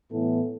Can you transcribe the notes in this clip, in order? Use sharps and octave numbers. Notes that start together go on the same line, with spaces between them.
A2 E3 B3 E4 A4